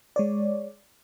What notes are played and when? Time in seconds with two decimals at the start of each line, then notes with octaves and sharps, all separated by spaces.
0.16 G#3 C#5 D5